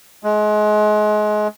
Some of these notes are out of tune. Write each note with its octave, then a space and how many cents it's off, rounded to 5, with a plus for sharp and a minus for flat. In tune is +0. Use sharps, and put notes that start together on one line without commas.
G#3 +30